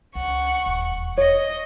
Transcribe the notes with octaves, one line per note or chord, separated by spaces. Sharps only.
C#2 F#5 C#6
D#1 E2
C#5 D#5